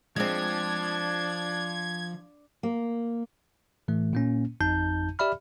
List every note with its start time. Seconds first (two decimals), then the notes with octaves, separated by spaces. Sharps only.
0.16 F3 G#3 C4 D4 G#6
2.63 A#3
3.88 A2 E3 A3
4.13 A#2 A#3 C#4
4.60 G#1 F2 D#4 A5 G6
5.19 G4 D5 E5 B5 F6